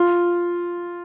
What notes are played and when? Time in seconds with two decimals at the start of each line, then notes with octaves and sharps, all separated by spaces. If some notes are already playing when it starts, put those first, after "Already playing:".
Already playing: F4